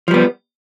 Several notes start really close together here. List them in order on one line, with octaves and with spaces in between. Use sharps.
F3 G3 B3